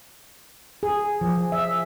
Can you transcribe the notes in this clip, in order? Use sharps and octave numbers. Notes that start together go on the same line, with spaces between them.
G#4
F3
E5